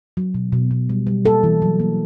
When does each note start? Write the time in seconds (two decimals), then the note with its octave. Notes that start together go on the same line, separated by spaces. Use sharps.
0.17 F#3
0.34 B2
0.52 B2
0.71 B2
0.89 G3
1.07 G3
1.25 A#3 A4
1.43 E3
1.62 F#3
1.79 A#3